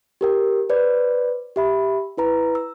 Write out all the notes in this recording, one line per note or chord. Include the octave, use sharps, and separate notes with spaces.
G4 A#4 G5
B4 C5 D5
G4 E5 B5
E4 B4 A#5
E6